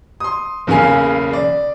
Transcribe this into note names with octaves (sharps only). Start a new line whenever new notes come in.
C6 D#6
B1 E2 C#3 A#3 F5 G#5
D5